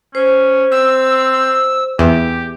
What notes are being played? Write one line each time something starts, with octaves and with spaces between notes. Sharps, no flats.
C#4 C5
C4 E6
E2 G4